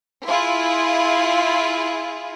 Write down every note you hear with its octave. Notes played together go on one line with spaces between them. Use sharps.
E4 F4 G#4